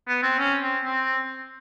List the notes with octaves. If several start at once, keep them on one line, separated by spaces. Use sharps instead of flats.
B3
C4
C#4
C4
C4